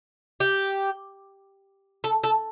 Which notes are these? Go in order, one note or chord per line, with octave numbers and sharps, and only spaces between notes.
G4
A4
A4